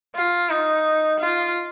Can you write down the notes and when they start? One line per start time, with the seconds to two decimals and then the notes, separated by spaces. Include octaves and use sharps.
0.16 F4
0.50 D#4
1.20 F4